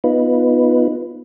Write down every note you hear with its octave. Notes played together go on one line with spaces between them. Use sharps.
B3 D#4 F4 B4